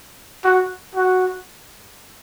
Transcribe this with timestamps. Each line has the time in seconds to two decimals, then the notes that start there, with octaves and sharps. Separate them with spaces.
0.44 F#4
0.95 F#4